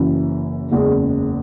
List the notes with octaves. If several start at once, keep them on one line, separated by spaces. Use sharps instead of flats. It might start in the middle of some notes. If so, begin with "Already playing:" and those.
Already playing: F#1 F#2 E3
F#1 E2 C#3 G#3